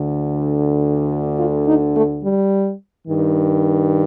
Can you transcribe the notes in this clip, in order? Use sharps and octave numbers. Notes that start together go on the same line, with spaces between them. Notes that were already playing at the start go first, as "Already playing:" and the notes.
Already playing: D2 D3
F4
D#4
A3
G3
G2 D#3